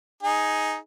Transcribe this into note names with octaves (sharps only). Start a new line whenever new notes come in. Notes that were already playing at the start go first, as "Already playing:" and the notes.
D#4 G#4